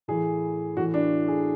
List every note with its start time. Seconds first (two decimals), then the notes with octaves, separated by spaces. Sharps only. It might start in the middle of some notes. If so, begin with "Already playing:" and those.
0.08 A2 E3 G#4
0.77 A2 E3 F#4
0.94 D4
1.28 G#4